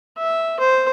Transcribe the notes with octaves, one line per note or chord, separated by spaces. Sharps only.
E5
C5